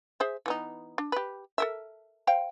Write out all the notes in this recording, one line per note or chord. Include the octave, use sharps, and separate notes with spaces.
G#4 C5 E5
E3 B3 D#4
D4
G4 B4
A4 A#4 E5
C5 F5 G5